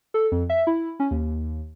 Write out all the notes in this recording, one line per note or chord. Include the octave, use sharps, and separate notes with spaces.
A4
F2
E5
E4
C#4
D#2